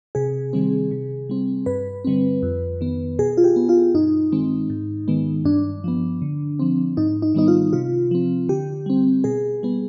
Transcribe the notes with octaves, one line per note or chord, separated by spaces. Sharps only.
C3 G#4
D#3 G3 C4
C3
G3 C4
G2 B4
D3 G3 C4
F2
D#3 B3
B2 G#4
F4
G4
B3
F4
G2 D#4
D#3 G#3 C4
G#2
D#3 G#3 B3
G2 D4
F3 B3
D3
F3 C4
G#2 D#4
D#4
D#3 G3 B3 D#4
F4
C3 F4
F3 C4
D3 G4
G3 C4
B2 G#4
G3 B3